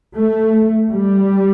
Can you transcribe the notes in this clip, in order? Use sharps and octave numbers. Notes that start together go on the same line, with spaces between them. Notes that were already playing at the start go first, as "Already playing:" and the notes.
A3
G3